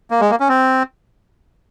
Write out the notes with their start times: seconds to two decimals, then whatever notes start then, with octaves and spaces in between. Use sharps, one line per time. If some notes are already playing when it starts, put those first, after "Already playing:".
0.11 A#3
0.21 G#3
0.30 A#3
0.40 C#4
0.49 C4